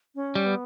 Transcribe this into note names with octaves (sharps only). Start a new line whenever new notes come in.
C#4
G3
B3